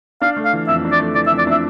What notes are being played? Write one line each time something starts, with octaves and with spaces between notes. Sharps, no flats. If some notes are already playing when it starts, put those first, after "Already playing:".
D4 F5
A3
F5
E3
F2 E5
D4
D5
A3
E3 D5
E5
F2
D5
D4 E5